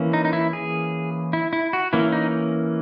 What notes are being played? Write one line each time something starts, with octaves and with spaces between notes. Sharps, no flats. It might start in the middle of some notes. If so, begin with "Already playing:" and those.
Already playing: E3 A#3 C#4
D#4
D#4
E4
G#4
E4
E4
F#4
E3 A#3 C#4 E4
D#4